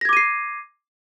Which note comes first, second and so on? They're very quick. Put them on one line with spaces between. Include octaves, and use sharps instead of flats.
A#6 G#6 D6 D#7 C7